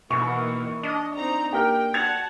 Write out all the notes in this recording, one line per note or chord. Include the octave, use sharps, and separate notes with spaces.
B2 D#3 E3 A#3 C#6
D4 D#5
C4 D#4 A#5
A#3 G4 A#4 G5
F#4 F#5 A5 G#6 F7